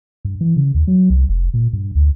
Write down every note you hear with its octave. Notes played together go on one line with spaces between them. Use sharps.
G2
E3
C#3
D#2
F#3
C2
F1
A#2
G2
D2